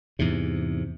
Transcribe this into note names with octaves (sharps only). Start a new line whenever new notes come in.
E2 G#2 C3